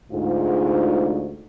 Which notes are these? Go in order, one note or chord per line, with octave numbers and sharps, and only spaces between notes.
D2 G#2 F4